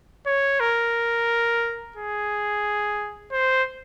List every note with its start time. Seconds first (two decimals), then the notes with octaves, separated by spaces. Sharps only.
0.26 C#5
0.60 A#4
1.96 G#4
3.33 C5